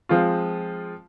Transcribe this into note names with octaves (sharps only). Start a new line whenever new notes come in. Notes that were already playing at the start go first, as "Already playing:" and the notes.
F3 G#3 C4 F4